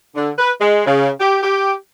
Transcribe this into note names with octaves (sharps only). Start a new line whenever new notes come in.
D3
B4
G#3
C#3
G4
G4